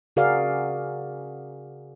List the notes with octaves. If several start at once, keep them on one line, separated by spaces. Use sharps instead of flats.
C#3 F#4 G#4 A#4 D5 F5